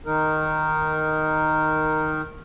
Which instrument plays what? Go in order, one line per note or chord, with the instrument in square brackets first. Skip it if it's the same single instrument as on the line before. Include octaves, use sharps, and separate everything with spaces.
[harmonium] D#3 D#4 A#4